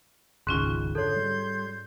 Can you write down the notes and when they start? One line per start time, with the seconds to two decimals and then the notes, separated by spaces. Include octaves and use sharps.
0.47 F1 C#2 G#2 D#3 C#4 F4 F#6
0.95 D3 A4 C#5 C6 G6 G#6
1.16 G3